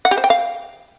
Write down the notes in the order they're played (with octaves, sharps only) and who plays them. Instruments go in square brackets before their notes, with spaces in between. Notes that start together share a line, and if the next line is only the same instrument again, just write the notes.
[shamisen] F#5
G4
C5
G5
F5